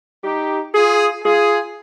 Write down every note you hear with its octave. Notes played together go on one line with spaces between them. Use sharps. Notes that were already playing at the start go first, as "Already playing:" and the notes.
D#4 G4
F4 G#4
F4 G#4